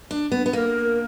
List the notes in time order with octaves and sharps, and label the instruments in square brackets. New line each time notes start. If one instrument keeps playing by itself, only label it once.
[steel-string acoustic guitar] D4
B3
B3
[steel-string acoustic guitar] A#3 [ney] A#4